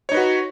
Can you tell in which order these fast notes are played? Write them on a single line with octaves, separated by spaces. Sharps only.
C#5 D#4 B4 F#4